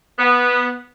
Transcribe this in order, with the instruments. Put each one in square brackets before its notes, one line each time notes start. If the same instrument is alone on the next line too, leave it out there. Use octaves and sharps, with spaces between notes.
[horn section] B3